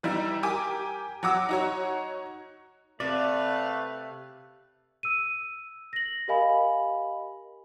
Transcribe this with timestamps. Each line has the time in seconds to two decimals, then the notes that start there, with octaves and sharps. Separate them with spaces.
0.03 E3 G3 D#4 E4
0.43 G4 A#4 G#5 D6
1.23 F#3 F#5 D6 E6
1.49 D#4 F#4 C#5
3.00 C3 A3 B4 D5 E5 F5
5.03 E6 D#7
5.93 A#6 F#7
6.28 G4 A#4 D#5 F5 G#5 B5